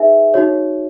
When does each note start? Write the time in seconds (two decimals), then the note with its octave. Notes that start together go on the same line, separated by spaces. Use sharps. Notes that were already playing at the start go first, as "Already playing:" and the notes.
Already playing: D#4 G#4 B4 E5 G#5
0.34 D#4 F#4 C#5